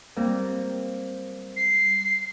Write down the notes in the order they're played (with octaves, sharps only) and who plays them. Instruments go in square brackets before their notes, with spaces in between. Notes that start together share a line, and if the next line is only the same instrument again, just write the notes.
[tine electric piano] G3 [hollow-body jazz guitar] A#3 C4
[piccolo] C7